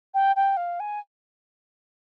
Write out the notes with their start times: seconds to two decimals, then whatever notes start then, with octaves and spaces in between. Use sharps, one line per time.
0.14 G5
0.36 G5
0.57 F5
0.80 G#5